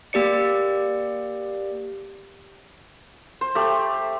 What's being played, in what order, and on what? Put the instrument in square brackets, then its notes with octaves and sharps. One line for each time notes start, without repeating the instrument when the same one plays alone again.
[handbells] A#3 G4 D5 C#7
[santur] C5
A3 G4